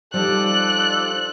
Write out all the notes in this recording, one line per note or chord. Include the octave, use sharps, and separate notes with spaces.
F3 G3 D#4 A4 D5 F#6